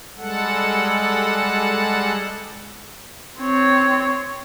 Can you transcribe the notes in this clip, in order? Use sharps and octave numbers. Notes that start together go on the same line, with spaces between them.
G3 G#3 A4 F#5
C4 C#5